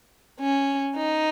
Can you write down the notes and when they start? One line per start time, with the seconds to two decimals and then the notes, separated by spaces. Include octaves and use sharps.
0.40 C#4
0.96 D#4